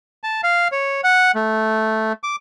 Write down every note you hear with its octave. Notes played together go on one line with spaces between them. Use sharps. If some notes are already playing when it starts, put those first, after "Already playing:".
A5
F5
C#5
F#5
A3
D6